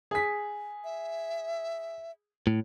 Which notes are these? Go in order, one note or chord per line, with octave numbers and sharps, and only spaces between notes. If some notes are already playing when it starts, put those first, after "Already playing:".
G#4 B6
E5
A2